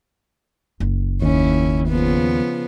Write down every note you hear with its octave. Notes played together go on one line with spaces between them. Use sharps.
F#1
D#2 C#4 E4
C#3 F3 B3